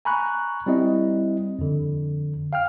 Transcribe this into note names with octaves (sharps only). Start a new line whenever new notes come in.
G#5 A#5 B5 C#6 F#6
G3 C4 E4 D#5
F2 D3
F5 G5 F6